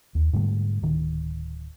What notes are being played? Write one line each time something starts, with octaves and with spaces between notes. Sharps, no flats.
D#2
G#2 D3 G3 A3
D1 D#3